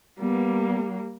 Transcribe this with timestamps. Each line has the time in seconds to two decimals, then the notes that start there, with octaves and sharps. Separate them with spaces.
0.20 G3 A#3 B3